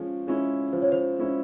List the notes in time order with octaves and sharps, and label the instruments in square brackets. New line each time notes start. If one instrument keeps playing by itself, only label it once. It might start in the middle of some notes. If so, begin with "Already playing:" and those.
Already playing: [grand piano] F3 G#3 C#4
G#3 C#4 E4
[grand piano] F3 [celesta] C5
[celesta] C#5
C5
[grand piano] G#3 C#4 E4